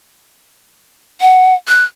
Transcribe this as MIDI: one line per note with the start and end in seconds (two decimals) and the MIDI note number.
1.21 1.54 78
1.68 1.84 90